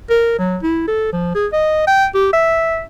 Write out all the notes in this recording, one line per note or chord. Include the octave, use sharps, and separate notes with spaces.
A#4
F#3
E4
A4
F3
G#4
D#5
G5
G4
E5